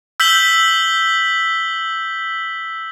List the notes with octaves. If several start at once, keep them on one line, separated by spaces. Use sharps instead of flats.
E6 G6 B6 F#7 G7